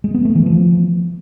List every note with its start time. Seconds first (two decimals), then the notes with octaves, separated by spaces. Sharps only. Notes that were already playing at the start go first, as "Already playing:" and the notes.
0.04 G#3
0.15 B3
0.25 A3
0.36 E3
0.46 F3